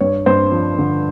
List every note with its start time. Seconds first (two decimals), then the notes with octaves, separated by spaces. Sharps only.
0.01 G2 C#5
0.26 G2 C5
0.52 F3
0.78 D3